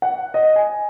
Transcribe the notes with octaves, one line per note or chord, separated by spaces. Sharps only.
F#5
D#5
G#5